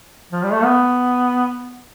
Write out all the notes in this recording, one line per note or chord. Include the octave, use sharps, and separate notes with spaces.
F3
G3
A3
B3